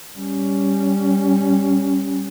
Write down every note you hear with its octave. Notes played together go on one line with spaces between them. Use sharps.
G3 C#4